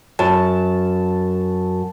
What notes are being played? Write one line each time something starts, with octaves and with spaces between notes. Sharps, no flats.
F#2 A5